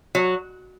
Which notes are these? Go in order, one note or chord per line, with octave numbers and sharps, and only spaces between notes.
F#3